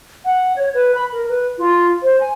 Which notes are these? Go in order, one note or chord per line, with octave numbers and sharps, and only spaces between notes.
F#5
C#5
B4
B5
A#4
B4
F4
C5
G#5